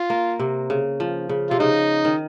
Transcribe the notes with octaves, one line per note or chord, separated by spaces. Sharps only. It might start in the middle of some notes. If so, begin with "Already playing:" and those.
Already playing: F4
A#3
C3
C#3
F3
C#3
C3 F4
C#3 D#4
D#3